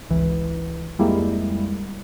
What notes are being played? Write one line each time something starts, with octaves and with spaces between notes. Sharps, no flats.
G#1 C#2 E3
F2 G3 G#3 A#3 E4